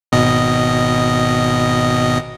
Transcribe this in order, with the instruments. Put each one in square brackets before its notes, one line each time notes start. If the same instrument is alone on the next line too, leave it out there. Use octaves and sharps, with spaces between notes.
[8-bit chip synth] G#1 B2 D#5